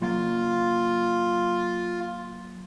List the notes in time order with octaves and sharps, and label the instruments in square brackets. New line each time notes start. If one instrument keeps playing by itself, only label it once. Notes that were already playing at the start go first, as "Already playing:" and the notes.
[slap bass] F#3 A#3 [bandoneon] F4